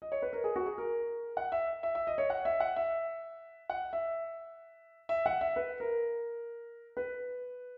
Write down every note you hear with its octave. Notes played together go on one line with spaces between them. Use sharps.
D#5
C#5
B4
A#4
G#4
F#4
G#4
A#4
F#5
E5
E5
E5
D#5
C#5
F#5
E5
F#5
E5
F#5
E5
E5
F#5
E5
B4
A#4
B4